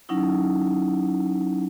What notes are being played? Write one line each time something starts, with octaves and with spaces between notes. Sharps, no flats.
F#3 C#4 D#4 E4